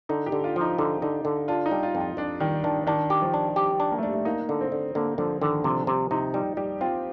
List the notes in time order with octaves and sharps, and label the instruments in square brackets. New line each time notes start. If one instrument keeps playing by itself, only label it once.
[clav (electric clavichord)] D3 [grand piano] D#4
[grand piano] G4
[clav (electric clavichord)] D3
[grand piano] F4
[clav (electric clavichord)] F3 [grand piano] D#4
[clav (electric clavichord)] D3 [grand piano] D#4
[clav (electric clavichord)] D3 [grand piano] D#4
[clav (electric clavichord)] D3
[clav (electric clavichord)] D4 [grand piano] F4
[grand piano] D#4
[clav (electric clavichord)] G3
[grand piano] F4
[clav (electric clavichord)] F2
[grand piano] F4
[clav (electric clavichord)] F2 [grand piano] D4
[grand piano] D#3 [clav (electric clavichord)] G3
[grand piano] D#3 [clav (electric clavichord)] D4
[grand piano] D#3 [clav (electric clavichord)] D4
[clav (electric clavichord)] G4
[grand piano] F3
[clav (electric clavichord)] D4
[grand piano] G3 [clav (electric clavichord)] G4
[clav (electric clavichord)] D4
[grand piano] A#3
A3
[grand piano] G3 [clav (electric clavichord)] D4
[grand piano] A3
[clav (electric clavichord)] A#3 [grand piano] D#4
[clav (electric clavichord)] D3
[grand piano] C4
[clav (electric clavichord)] D3
[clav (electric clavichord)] D3 [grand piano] A#3
[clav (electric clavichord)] D3 [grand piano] F3
[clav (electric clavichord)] D3 [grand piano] D#3
[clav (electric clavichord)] C3 [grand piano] F3
[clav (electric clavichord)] C3 [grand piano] G3
[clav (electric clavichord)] C3 [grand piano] D#4
[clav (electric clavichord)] G3 [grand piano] D#4
[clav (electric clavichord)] G3 [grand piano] G4
[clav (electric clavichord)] C4 [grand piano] F4